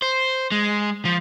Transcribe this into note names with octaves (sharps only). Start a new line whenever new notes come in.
C5
G#3
F3